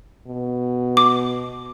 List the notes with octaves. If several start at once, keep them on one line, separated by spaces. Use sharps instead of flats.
B2
D6